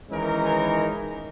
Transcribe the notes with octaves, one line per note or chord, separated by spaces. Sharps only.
D#3 E3 G#3 C#4 D#4 A#4